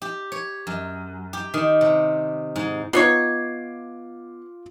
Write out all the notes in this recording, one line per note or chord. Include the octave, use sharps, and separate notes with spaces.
G4
C#5
F#2
G4
D#3
C3
G#2
B3 D#4 F4 C#5 D6 C7